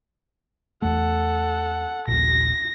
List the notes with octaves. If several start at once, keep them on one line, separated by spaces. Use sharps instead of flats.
E2 A3 A4 F#5
D#1 A#1 A#6